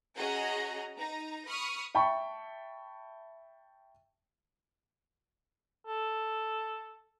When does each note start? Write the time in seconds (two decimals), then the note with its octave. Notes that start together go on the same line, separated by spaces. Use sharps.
0.16 C#4 F#4 G#4 D#5 A#5
0.96 D#4 A#5
1.48 B5 C#6 D#6 F6
1.95 E5 G5 A5 B5 C#6
5.87 A4